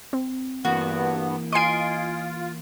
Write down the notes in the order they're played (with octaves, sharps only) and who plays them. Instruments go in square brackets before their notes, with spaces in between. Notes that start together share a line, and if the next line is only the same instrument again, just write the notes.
[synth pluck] C4
[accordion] G2 B3 [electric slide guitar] E3 A#3 [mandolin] F#4
[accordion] F4 [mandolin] D#5 G#5 [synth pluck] C6 C7 D7